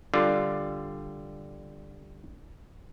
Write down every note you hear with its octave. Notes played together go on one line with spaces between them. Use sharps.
D3 G3 F4